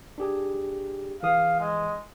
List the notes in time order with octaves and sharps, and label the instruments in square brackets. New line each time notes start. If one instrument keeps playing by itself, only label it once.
[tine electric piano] D4 G4 G#4
[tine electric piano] E3 G#4 D#6 [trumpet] F5
[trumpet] G#3